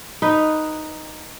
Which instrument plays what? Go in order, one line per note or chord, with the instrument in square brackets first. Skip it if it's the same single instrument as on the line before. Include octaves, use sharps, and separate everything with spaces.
[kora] D#4 B4